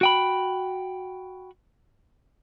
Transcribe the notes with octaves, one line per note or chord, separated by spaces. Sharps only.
F#4 G5 B5